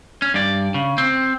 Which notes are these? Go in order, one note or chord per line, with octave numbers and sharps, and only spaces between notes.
C#4
G2 D5
C#3
C4